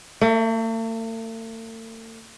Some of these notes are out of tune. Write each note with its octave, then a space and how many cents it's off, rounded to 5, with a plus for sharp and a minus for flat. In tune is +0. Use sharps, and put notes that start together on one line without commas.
A3 +45 E5 +0